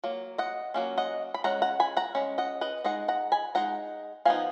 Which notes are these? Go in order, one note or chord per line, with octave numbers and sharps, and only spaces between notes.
F#3 A#3
D#5 F#5
F#3 A#3 C#4
D#5 F#5
B5
G#3 C#4 F#5 A#5
F#5 A#5
G#5 B5
F#5 A#5
G#3 C#4
D#5 F#5
B4 D#5
G#3 D#4 D#5 F#5
F#5 A#5
G#5 B5
G#3 D#4 F#5 A#5
F3 B3 D#4 F5 G#5